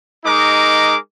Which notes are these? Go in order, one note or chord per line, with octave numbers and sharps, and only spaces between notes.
G#3 D#4 A#4 D#5 D6